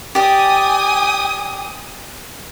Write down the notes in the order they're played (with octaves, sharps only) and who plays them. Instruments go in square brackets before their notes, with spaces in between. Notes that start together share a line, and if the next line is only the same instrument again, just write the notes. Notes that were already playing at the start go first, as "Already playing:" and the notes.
[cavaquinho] G4 D5 [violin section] G5 G#5 D#6